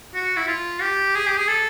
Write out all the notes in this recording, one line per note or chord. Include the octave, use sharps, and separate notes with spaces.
F#4
E4
F4
G4
G#4
G4
G#4
A4